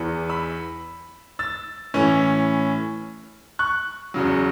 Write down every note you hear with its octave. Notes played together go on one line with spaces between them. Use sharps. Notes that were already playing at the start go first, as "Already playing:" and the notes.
Already playing: E2 E3 B3
B5 E6
E6 A6
A2 E3 C#4
C#6 F#6
E2 C#3 F#3